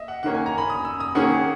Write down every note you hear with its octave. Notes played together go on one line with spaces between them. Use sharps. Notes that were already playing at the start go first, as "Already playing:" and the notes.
Already playing: D#5 E5
F#5
D#3 A#3 C#4 F#5
G#5
A#5
B5
D#6
E6
D#6
D#3 A#3 C#4 G#4 F#5